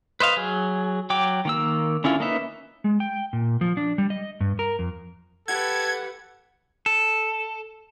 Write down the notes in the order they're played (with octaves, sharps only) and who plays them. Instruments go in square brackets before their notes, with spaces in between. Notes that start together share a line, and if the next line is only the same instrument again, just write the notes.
[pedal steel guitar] B4 C5 D#5 F5
F#3 G#4
F#3 G5 D6
D#3 A#3 E6
D3 C#4 E4 F4
A#3 C#4 D#4 B4 E5
[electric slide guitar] G#3
G5
A#2
F3
D4
G3
D#5
G2
A#4
F2
[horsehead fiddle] G4 B4 [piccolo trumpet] A4 [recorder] F#5 [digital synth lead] G#6
[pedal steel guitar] A4